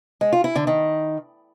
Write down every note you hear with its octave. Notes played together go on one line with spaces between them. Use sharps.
G#3
F4
E4
D3
D#3